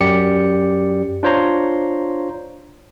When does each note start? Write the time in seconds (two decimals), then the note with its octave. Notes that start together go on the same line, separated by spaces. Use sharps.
0.01 F#2 G4 D5 C#7
1.23 D4 F4 C5 C#5 A#5 C6